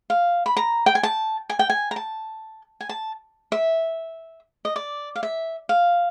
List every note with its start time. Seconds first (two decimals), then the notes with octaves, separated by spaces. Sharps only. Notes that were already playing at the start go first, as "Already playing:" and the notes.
0.10 F5
0.46 B5
0.57 A#5
0.86 G5
0.95 G#5
1.03 A5
1.49 G#5
1.59 G5
1.70 G#5
1.91 A#5
1.96 A5
2.81 G#5
2.89 A5
3.52 E5
4.65 D#5
4.76 D5
5.16 F5
5.23 E5
5.69 F5